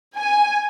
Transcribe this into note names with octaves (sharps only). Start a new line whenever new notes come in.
G#5